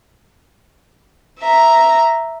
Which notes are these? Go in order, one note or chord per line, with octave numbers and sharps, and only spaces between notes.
E5 A#5